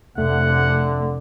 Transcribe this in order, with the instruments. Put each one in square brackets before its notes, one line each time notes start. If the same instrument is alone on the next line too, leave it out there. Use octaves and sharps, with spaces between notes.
[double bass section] F1 [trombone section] D3 [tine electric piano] A3 [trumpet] F#5